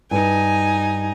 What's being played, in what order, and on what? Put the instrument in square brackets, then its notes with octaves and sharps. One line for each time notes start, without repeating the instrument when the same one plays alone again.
[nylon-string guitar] G2 [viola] D#4 G#5